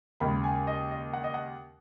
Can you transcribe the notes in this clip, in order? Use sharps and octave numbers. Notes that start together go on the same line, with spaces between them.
D#2 C#3 G#3 B5
G#5
D#5
D#5
F#5
D#5
F#5